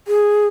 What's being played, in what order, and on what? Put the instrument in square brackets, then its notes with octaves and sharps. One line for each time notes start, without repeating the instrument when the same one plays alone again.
[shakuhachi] G#4